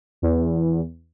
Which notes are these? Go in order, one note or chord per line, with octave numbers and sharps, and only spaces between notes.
E2